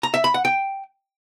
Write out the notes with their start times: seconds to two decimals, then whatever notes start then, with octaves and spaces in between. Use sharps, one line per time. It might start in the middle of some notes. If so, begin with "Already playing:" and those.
0.03 A#5
0.14 E5
0.24 B5
0.34 F#5
0.45 G5